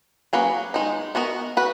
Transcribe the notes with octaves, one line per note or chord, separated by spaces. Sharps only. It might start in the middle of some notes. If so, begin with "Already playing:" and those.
F#3 A#3 C#4 G#4 B4
D#3 G#3 D#4
B3 F#4 A#4 D#5
F#4 B4